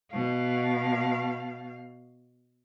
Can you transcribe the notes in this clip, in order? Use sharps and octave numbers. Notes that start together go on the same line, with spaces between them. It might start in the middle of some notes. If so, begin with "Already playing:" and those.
B2 F5